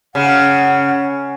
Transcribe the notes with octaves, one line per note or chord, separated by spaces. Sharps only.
C#3 F#5